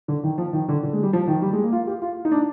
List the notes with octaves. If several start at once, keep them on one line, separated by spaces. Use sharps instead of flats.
D3
D#3
F3
D#3
D3
D3
G#3
G3
F3
D#3
G3
G#3
A#3
F4
G4
F4
D#4
D4